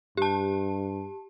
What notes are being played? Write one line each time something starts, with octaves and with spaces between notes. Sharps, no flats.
G2 G4 A5